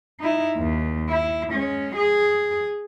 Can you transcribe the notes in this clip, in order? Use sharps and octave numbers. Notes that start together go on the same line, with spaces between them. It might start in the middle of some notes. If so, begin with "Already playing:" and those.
D#4 E4
D#2
E4
G#3 C#4
G#4